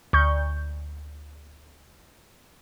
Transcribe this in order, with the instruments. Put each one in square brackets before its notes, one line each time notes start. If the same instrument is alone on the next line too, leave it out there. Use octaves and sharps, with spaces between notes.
[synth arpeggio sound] D2 C#6 G6